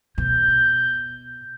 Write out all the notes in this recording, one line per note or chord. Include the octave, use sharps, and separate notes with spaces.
B2 G6